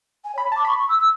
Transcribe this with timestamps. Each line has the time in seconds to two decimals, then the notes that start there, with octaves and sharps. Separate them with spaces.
0.24 G#5
0.35 C#5 B5
0.52 A5 D6
0.65 B5 C#6
0.78 C#6
0.89 E6
0.99 E6